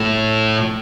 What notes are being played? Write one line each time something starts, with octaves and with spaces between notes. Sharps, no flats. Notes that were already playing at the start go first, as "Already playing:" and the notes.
Already playing: A2